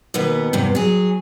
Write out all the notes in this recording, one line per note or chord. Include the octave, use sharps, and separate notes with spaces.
D#2 B2 B3
E2 G2 C3
F#3 G#4